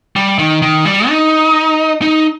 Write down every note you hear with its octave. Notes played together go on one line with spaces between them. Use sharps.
G3
D#3
D#3
G3
D#4
D#4